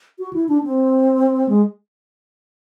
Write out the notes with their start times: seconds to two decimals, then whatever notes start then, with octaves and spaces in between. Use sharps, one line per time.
0.19 F#4
0.33 E4
0.49 D4
0.64 C4
1.49 G#3